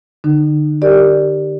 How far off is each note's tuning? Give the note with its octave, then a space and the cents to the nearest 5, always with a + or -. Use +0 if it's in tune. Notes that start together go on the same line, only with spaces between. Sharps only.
D3 +20 D#4 -35
G4 +0 A#4 -15 D5 +0